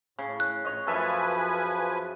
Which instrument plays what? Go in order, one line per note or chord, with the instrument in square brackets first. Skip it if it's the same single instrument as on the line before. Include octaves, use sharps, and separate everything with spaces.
[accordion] A2 [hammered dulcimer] C#3
[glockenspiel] F#6
[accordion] A2 [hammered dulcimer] C#5 D#5
[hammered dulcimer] F#2 A4 E5 [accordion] F3 B4 G#5